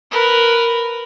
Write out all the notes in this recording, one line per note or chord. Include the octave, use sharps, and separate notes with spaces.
A#4 B4